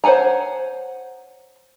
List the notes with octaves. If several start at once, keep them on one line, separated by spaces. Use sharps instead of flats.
C5 C#5 F#5 G#5 A#5